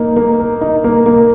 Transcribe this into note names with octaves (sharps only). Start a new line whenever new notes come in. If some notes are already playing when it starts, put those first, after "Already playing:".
Already playing: A#3 D#4
A#3
A#4
D#4
A#3
A#3